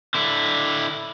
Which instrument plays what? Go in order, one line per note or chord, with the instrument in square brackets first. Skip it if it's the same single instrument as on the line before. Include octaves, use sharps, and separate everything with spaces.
[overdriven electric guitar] D3 E4